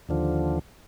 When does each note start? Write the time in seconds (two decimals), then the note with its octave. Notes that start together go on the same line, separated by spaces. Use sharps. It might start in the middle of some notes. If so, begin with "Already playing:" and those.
0.09 D#2 D3 F3